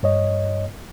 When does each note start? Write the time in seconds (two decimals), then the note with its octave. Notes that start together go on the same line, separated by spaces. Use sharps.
0.03 G2 C#5 D#5